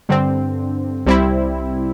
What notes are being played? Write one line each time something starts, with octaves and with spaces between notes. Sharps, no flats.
G2 D3 C4
C2 C3 G3 C4 E4